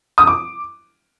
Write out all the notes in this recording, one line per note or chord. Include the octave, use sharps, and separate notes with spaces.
D#6
D6